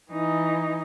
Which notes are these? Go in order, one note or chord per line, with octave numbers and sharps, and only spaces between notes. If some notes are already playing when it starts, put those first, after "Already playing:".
E3 D#4